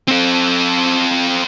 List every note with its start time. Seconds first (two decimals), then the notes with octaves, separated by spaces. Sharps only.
0.08 C4 A4